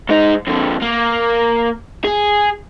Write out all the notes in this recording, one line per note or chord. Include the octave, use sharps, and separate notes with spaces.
G#2 D#4
F2 D3
A#3
G#4